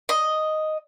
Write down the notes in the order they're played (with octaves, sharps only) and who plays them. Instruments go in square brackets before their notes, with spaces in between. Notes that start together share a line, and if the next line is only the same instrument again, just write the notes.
[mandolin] D#5